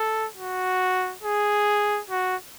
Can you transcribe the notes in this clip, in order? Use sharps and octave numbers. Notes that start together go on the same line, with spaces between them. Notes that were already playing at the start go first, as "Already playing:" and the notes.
Already playing: A4
F#4
G#4
F#4